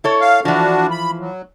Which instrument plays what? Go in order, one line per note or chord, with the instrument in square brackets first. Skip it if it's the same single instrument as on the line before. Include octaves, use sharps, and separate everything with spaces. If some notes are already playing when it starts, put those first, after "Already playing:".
[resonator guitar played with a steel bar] E4 A4 C#5
[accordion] F5
[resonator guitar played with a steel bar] E3 F3 [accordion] D4 F#4
[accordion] B5
F#3